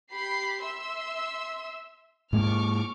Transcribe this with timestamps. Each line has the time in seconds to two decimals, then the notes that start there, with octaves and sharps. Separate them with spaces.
0.12 G4 B5 C7
0.64 E5 C6 E6
2.33 G#2 G#3 A#3 C#6 D6 F6